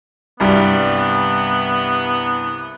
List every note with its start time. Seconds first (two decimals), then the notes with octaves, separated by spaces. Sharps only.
0.40 C2 G2 G3 B3